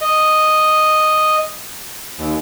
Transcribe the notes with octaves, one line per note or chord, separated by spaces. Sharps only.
D#5
D#2